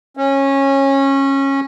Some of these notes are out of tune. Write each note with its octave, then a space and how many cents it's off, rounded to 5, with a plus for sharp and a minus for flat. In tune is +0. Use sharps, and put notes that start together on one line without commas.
C#4 -20